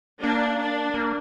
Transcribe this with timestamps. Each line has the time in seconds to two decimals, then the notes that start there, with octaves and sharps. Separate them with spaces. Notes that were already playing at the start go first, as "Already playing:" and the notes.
0.23 A#3 D4
0.59 D4
0.94 A#3